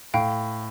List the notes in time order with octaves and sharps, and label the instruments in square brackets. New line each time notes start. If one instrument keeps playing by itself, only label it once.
[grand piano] A2 [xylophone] F5 G5